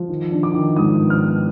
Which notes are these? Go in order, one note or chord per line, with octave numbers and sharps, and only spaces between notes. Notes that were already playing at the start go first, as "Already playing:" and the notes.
Already playing: F3
D#3
D4
D6
D#3
G#2 D#6
B3
F6
B3